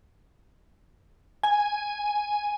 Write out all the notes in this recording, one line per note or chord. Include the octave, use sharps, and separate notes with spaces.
G#5